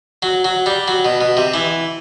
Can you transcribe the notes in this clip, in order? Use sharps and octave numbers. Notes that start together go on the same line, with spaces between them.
F#3
F#3
G3
F#3
B2
B2
C3
E3